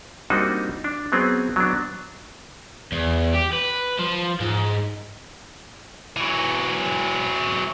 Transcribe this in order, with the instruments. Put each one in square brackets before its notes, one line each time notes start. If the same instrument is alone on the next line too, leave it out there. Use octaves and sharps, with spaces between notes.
[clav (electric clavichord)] G3 A#3 C4 D4 D#4 F#4
D4
F#3 B3 C4 G#4
F#3 B3 D4
[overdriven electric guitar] E2
G4
B4
F3
G#2
[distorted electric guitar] E3 F#3